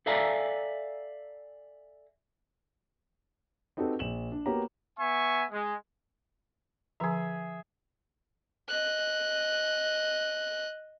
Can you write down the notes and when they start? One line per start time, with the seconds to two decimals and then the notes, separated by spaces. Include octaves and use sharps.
0.06 A4 D5 E5 F5 G#5 A#5
3.77 C4 D#4 F#4 G4 A4 B4
3.99 A#1 E7 F#7
4.32 D4
4.46 A#3 B3 F#4 G4 C#5 A#5
4.98 B3 E5 G#5 C#6
5.51 G#3
7.00 D3 F3 G#4 E5 A#5
8.69 D#5 F#6